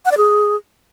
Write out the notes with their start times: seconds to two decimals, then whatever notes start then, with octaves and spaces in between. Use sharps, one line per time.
0.05 F#5
0.11 D5
0.17 G#4